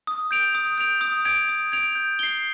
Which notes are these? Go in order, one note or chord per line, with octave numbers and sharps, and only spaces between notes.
D#6
G6 D7 F7
D#6
G6 D7 F7
D#6
G#6 D7 F7
D#6
G#6 D7 F7
G6
C7 G7